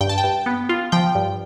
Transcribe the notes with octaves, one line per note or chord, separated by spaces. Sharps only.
G2 G5
A5
G5
G2
B3
F4
F3 G5
G2